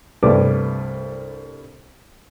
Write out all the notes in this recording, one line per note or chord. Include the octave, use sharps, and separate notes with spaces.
C2 G2 A3 B4 D5 D6